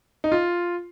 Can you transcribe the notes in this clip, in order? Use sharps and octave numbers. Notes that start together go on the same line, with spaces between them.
D#4
F4